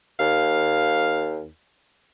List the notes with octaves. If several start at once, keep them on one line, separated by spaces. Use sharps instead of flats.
D#2 F5